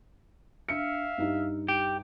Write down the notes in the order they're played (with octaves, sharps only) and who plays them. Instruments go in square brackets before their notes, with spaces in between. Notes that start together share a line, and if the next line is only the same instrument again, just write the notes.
[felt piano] D4 C#7 [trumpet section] E5 F5
[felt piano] G2 G3 D#4
[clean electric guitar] G4